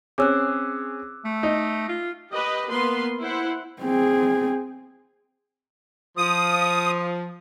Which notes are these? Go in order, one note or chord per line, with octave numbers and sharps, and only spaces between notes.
C4 C#4 G#4 D6 E6 F#6
A3
D#4
F4
G4 B4 D#5
A#3 B3 B4 C6
E4 C5 F#5
C4 G#4
F3 D#6